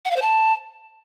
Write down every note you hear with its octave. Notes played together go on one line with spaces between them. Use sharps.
F#5
F5
C5
A5